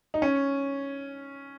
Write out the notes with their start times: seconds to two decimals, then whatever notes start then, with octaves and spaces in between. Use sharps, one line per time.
0.14 D#4
0.22 C#4